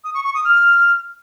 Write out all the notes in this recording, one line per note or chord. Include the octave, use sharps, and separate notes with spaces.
D#6
C#6
C#6
D#6
F6